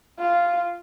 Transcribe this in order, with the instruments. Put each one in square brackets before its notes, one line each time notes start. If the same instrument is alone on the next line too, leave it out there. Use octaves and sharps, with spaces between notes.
[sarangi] F4